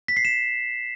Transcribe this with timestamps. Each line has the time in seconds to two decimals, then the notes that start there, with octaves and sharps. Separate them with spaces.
0.08 B6
0.17 C7
0.25 E7